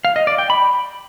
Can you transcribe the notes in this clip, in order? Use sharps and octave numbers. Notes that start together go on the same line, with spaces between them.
F5
D#5
D5
G5
B5